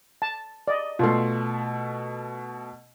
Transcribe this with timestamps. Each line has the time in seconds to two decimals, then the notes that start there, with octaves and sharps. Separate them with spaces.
0.22 A5
0.68 D5 D#5
0.99 B2 A3 F4